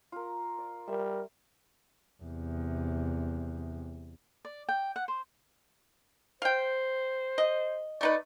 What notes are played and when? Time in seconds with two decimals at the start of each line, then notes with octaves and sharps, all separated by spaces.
0.12 F4 A#4
0.58 D5
0.88 G3 A#4 E5
2.23 E2 C3
4.45 D5
4.69 G5
4.96 F#5
5.08 C5
6.42 C5 F5 G5
7.38 D#5
8.01 A3 D#4 B4 D5